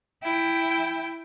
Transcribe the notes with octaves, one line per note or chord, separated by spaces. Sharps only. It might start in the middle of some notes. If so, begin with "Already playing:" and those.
E4 G5